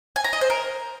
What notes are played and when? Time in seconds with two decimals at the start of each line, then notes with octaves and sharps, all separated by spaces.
0.16 G#5
0.24 A#5
0.33 D#5
0.41 C5
0.50 A#4